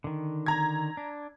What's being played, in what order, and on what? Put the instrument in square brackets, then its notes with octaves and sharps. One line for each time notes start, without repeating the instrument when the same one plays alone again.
[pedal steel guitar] D3 D#3
[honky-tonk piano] A#5 G#6
[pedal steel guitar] D4